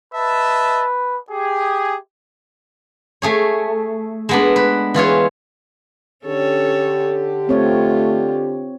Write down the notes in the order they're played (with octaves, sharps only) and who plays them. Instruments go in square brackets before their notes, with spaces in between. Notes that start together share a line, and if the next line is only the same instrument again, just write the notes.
[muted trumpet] B4 [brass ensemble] D#5 E5 A5
[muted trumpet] G4 [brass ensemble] G#4
[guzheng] A3 G#4 C#5
G#3 B3 D4
B4
E3 F4 G#4 C#5
[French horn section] D3 G4 [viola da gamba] C#4 A4 C#5
[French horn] A3 [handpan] C4 C#5 [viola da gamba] F4